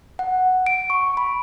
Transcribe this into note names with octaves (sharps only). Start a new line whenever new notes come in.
F#5
D7
C#6
B5